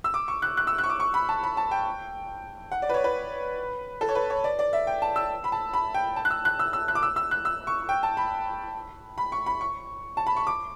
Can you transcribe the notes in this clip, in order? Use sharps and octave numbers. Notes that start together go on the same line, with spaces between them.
E6
D6
C#6
F#6
F#6
E6
F#6
C#6
D6
C#6
B5
A5
B5
A5
G5
F#5
D5
B4
C#5
B4
A4
C#5
B4
C#5
D5
D5
E5
G5
A5
E6
B5
A5
B5
G5
A5
F#6
E6
F#6
E6
E6
F#6
D6
E6
E6
F#6
E6
C#6
G5
A5
B5
B5
C#6
B5
C#6
A5
B5
C#6
D6